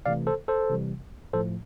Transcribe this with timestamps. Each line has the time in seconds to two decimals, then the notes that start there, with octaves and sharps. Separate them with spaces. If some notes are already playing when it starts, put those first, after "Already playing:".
0.06 C3 E3 A3 D5 F5
0.27 A4 C5
0.48 A4 C5
0.70 C3 E3 G3
1.33 A2 F3 A3 A4 C5